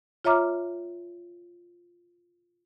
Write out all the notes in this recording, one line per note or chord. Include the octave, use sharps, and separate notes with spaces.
F4 C#5 E5 A#5 D6 F6